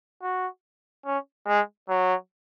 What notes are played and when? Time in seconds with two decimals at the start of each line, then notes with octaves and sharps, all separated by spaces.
0.22 F#4
1.06 C#4
1.47 G#3
1.89 F#3